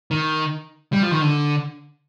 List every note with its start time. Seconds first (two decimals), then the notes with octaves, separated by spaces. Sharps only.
0.11 D#3
0.93 G3
1.03 F3
1.11 D#3
1.21 D3